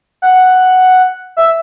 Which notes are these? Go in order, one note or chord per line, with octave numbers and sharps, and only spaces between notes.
F#5
E5